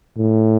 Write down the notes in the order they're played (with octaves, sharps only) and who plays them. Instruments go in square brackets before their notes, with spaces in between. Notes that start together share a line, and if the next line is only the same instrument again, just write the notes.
[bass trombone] A2